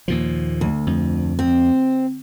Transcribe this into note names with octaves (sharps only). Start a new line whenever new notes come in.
D#2 A#2 F3
D2
F2
C4